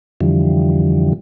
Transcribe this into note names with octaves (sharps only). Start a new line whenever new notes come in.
F2 D3 E3 F3 G3